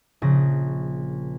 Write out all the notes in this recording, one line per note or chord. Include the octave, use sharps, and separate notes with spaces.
A#1 C#3 A#6